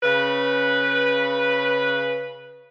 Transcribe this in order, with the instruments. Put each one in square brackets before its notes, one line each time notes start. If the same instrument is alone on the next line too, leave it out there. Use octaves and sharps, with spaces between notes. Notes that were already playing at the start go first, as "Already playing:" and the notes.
[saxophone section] C#3 B4